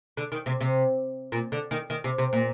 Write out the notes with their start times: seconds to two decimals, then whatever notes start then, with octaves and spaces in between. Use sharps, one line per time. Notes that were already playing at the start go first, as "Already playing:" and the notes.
0.17 D3
0.32 D#3
0.46 C3
0.60 C3
1.32 A#2
1.52 D3
1.71 D#3
1.90 D#3
2.04 C3
2.18 C3
2.33 A#2